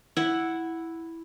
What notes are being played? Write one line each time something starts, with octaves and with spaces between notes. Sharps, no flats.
E4 F#5